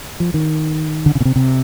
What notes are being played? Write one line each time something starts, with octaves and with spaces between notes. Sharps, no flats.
F3
D#3
D3
C#3
B2
C3
C3